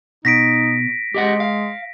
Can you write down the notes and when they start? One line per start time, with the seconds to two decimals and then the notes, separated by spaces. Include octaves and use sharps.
0.25 B2 D#4 A#6 B6 D7
1.15 G#3 G4 D#5 F#5
1.40 F5